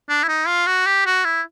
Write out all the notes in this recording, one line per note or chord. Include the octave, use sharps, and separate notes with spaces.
D4
E4
D#4
F4
F#4
G4
F#4
E4